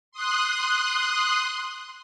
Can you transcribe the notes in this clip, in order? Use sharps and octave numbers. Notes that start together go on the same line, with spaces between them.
C6 D#6 F#6